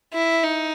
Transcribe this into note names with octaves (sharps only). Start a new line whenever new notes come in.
E4
D#4